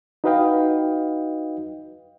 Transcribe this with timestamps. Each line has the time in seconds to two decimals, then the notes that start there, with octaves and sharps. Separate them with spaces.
0.24 D#4 F#4 B4 D#5 F5 G5